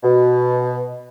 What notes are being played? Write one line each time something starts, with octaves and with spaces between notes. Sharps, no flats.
B2